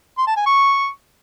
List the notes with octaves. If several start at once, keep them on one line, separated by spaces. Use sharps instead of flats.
C6
A5
G#5
C#6